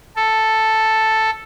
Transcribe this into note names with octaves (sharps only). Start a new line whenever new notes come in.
A4